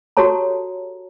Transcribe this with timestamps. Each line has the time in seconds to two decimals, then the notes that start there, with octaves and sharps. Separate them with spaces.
0.17 F#4 G4 A4 C#5 A5 A#5